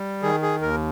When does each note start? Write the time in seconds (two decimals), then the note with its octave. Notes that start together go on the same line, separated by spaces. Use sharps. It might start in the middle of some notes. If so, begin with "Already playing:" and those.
Already playing: G3
0.22 D#3 G#4
0.42 G#4
0.61 D#2 A#4